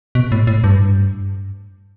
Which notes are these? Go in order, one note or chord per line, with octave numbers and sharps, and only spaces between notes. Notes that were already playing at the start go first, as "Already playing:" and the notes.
B2
A2
A2
G2